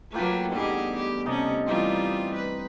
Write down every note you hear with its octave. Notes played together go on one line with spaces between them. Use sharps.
F#3 A3 A#3 F4 B4 G5
G2 B2 E3 D#4 G4 G#4
G4
C3 C#4 D#4 D#5 A5
E3 G3 C4 D#4 F4
B4